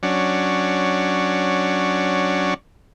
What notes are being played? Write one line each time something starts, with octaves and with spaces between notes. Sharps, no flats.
F#3 C#4 D4